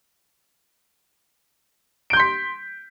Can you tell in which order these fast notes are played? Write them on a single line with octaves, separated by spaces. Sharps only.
D7 G6 C6 B6